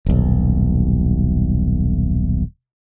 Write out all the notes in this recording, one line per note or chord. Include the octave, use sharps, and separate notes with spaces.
D#1 B1